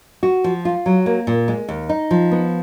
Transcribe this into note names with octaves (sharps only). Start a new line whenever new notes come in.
F#4
F3
F4
F#3
A#3
A#2
G#3
D#2
D#4
F3
B3